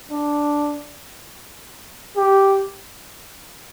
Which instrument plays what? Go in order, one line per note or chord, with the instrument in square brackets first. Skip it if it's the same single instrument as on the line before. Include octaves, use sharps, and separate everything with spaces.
[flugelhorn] D4
G4